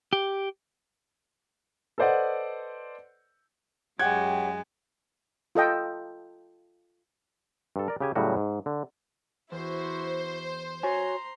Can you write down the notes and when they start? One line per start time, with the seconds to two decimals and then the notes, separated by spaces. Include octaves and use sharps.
0.13 G4
1.98 A4 B4 C5 D5 D#5 F#5
3.99 F#2 G#3 G4 C#5 F#5 G5 F#6 G#6
5.55 F4 A4 D#5 G5
7.76 G2 A4
7.88 A#4 D5
8.00 C#3 G4 G#5
8.15 A2 C#3 F#3 G3 F#4
8.37 G#2
8.66 D3
9.52 E2 E4 F#4 C5
10.83 F#4 C#5 G#5 A#5 C6